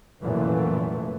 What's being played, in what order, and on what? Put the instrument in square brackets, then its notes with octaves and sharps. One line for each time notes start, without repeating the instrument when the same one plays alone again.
[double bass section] F1 F#2 A#2 E3 A3